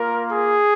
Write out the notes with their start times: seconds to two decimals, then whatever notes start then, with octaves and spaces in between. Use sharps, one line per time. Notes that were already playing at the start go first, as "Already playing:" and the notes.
Already playing: A#3 F4 A#4
0.32 G#4